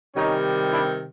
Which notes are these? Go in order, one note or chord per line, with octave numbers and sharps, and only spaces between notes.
C3 D#3 G3 C#4 D#4
D4 E4